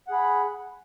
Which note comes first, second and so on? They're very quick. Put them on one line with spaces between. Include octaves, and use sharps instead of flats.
F#5 G#4 B5